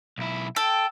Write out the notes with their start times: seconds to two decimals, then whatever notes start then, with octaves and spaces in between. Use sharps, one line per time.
0.18 B1 E4
0.56 A4 G5